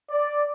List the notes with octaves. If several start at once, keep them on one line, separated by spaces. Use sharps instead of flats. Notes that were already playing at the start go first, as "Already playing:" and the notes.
D5